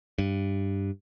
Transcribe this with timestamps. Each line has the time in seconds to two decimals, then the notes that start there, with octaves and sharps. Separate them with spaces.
0.18 G2